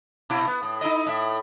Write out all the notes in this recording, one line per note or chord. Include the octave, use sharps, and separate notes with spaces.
B2 E4
B3
A2
D#4 E4 D#5
A2 E5